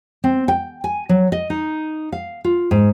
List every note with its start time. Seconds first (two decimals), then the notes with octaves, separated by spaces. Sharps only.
0.24 C4
0.48 G5
0.84 G#5
1.09 F#3
1.32 D#5
1.50 D#4
2.12 F5
2.44 F4
2.71 G#2